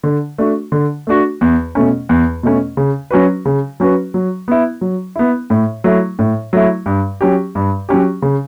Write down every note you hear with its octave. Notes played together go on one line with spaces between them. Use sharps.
D3
A3 D4 F#4
D3
A3 D4 F#4
E2
B2 A3 C#4
E2
B2 A3 C#4
C#3
F#3 C#4 F#4 B4
C#3
F#3 C#4 F#4 B4
F#3
B3 E4
F#3
B3 E4
A2
F#3 A3 E4
A2
F#3 A3 E4
G2
F#3 C#4 G4
G2
F#3 C#4 G4
C#3